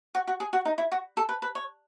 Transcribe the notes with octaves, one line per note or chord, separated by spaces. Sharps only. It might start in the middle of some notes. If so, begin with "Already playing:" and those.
F#4
F#4
G#4
F#4
D#4
E4
F#4
A4
B4
B4
C#5